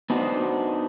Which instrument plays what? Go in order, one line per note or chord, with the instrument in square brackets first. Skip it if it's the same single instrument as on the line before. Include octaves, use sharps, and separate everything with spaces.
[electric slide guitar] B3 D4 D#4 F#4 A#4 C5